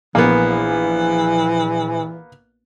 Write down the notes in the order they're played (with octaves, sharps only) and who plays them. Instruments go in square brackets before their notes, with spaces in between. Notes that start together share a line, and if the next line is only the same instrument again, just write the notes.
[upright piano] A#1 [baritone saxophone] E3 [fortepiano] A#3 B3